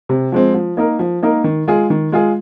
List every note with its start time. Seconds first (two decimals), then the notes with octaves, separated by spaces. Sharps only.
0.09 C3
0.32 F3 G#3 C4
0.54 F3
0.77 A#3 D#4 A#4
0.99 F3
1.23 A#3 D#4 A#4
1.44 D#3
1.68 G#3 F4 G#4
1.90 D#3
2.12 G#3 F4 G#4